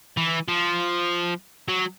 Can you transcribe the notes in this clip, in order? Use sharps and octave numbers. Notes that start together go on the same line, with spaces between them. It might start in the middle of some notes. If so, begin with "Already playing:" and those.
E3
F3
F#3